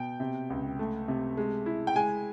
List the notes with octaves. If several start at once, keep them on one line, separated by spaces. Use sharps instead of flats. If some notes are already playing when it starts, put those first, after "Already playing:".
Already playing: B2 G5
C3
C#2
A3
C3
G#3
E4
G5
G#3 G#5